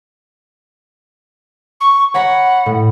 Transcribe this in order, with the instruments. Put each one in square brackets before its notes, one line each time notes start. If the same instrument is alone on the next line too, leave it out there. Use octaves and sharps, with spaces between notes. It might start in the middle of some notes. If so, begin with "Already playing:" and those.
[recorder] C#6
[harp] C#5 A#5 B5 [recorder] F#5
[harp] A2